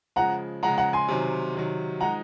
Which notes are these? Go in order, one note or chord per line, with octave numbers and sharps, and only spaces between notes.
C#3 F3 G#3 F#5 A#5
C#3 F3 G#3 F#5 A#5
F#5 A#5
G#5 C6
C3 D#3 F#3
C3 D#3 F#3
F3 G#3 D#4 F#5 A#5